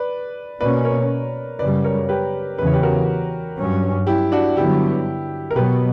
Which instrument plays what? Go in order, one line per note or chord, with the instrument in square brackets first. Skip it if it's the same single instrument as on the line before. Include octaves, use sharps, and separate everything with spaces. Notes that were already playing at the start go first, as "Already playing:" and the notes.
Already playing: [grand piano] B4 D5
[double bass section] B2 A#3 C#4 [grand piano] B4 D5
[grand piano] A#4 C#5
[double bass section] F#2 C#3 G3 [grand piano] B4 D5
[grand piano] A#4 C#5
G4 B4
[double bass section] E2 C#3 E3 [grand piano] B4
[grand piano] C#5
G4 B4
F#4 A#4
[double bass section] G2 F#3 C#4
[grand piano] E4 G4
D4 F#4
[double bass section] G2 D3 F#3 B3 [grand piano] E4 G4
[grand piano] A#4
[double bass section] B2 F#3 B3 [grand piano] G4 B4